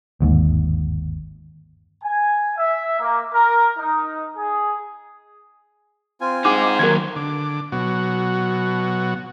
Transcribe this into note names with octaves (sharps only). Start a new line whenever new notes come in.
G1 D#2 G#2
G#5
E5
A#3
A#4
D#4
G#4
C4 F4 G#5
D#4 G#4 F#5 D6
D#2 F#3 A#4 G#6
D3 D6
B2 F#3 F#4